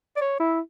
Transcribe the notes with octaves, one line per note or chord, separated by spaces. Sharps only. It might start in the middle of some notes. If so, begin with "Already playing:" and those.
D5
C#5
E4